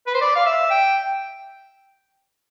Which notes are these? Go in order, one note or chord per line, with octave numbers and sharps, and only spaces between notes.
B4
C5
D5
F5
E5
G5